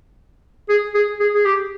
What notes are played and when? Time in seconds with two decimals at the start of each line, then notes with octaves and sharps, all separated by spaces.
0.69 G#4
0.95 G#4
1.20 G#4
1.34 G#4
1.45 G4